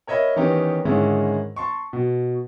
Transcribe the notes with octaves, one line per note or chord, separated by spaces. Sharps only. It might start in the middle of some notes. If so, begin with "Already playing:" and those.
A#4 C#5 D#5 E5 B5
D#3 E3 B3 C#4 D#4 G4
G#2 D3 D#3 G#3 C#4 E4
A5 C6 C#6
B2